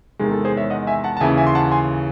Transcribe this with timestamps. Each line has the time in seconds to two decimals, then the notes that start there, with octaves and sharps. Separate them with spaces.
0.19 E2 C3 D#3 G#3 G#4
0.32 A4
0.45 G#4 C5
0.57 C#5 E5
0.70 D#5 F#5
0.87 E5 G#5
1.04 F#5 A5
1.17 A5
1.21 D#2 C#3 E3 E5 G#5
1.37 E5 G#5
1.47 C6
1.55 F#5 A5
1.72 G#5 C6